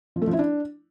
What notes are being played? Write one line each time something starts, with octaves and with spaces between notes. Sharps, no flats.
F3
A3
F3
E4
D4